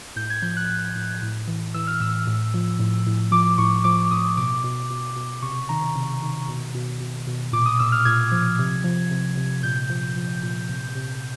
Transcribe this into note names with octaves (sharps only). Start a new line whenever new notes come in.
A2 G6
G#6
F3 G6
F#6
A2
A2
A2
E3
E3 E6
F6
A2 E6
A2
F3
A2
A2
F3 D6
A2 C#6
F3 D6
A2 D#6
B2 D6
B2
B2
B2
C3 C#6
D#3 A#5
A#5
C3
D#3
B2
B2
B2
B2
A#2 D6
D#6
A#2 E6
F6
A#2 G#6
F3
C3
F3
C3
C3
A#2 G6
F3
F3
A#2
C3
C3